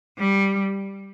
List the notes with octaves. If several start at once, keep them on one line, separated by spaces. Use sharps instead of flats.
G3